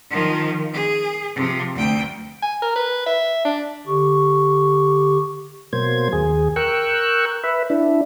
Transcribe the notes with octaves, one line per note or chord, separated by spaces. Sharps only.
D#3 F3
G#4
C3 F3
D2 G5
G#5
A#4
B4
E5
D4
D3 G4 C#6
B2 F#3 A#3 C5 G#6
D#2 G#4
A#4 G5 C#6 E6 F#6
B4 E5
D4 E4